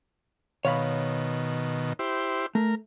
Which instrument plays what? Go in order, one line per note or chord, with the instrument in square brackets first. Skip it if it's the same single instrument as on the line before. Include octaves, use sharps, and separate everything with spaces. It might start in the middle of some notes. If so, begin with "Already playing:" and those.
[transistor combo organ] B2 D#3 [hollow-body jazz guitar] C#5 F5 B5
[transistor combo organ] E4 G4 C5
[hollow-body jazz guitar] A3 [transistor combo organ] A#4